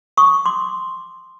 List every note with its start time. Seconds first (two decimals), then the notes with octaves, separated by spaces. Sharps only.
0.17 C#6 D#6
0.46 C6 D6